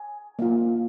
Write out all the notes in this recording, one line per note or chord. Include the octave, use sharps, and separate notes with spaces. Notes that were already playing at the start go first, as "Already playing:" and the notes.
Already playing: G#5
A#3 F4